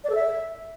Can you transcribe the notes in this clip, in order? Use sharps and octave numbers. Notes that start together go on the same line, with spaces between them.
D5
A4
E5